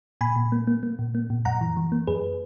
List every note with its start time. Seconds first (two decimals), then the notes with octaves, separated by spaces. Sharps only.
0.21 A#2 G#5 B5
0.36 A#2
0.52 A#3
0.67 A#3
0.83 A#3
0.99 A#2
1.15 A#3
1.30 A#2
1.45 F#2 F#5 A#5
1.61 E3
1.77 E3
1.92 A#3
2.07 F#2 G#4 B4